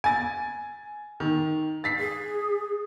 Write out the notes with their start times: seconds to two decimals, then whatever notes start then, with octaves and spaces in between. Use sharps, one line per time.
0.04 G#5 A6
1.20 D#3
1.84 A6 B6 C7
2.00 G#4